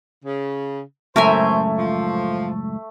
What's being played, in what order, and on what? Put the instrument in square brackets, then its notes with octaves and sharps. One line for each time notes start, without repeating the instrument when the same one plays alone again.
[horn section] C#3
[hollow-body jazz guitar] C#2 F#2 A2 [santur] A3 [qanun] A#4 E5 G#5 [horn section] C5
[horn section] F3